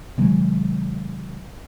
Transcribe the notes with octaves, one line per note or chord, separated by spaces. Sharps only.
C3 D#3 F#3 G#3